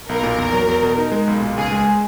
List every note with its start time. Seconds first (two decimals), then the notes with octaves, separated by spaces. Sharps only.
0.09 B1 A#4
0.23 A#2
0.38 E2
0.53 F#3
0.68 E2
0.83 B2
0.98 D#4
1.12 G#3
1.27 B1
1.42 A#2
1.57 C#2 G#4
1.72 G#3